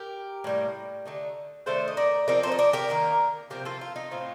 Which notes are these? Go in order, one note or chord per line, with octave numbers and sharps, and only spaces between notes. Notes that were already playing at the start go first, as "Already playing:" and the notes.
Already playing: G4 A#4
A2 G3 A#3
D3 A3 D#4
D#3 A3 D4 A4 C5
D#5
A#4 D5
F3 C4 D#4 A#4 D5
A4 C5
D#5
A#4 D5
G4 A#4
D#3 A#3 D#4
C3 F3 A#3 G4 A#4
F4 A4
F4
D#4
A2 A3 C4 F4